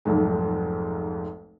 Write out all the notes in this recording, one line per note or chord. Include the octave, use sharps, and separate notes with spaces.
F1 B1 G#2